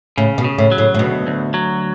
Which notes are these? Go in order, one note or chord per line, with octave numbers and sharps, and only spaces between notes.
A2 C#3
B2
C#3
A2
F#3
A2
A2
D2 B2
D2
F#3